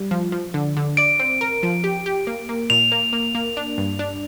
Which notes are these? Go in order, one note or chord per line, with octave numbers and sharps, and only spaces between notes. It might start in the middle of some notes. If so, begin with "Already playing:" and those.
Already playing: G3
F3
F3
D3
D3
D5 D7
C4
A#4
F3
G4
G4
A#3
A#3
A#2 F7
A#3
A#3
A#3
D4
G2
D4